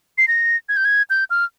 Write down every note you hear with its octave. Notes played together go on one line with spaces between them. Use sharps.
C7
A#6
G#6
G6
G#6
G6
F6